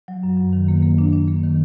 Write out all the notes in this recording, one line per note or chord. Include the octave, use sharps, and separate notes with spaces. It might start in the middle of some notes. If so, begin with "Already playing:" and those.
F#3
F#2
F#2
D#3
A#3
A#3
D4
D4
A#3
D#3